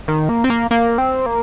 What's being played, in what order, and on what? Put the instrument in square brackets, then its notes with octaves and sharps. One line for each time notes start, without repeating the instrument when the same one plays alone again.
[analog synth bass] D#3
A#3
C4
A#3
A#3
C4
A#3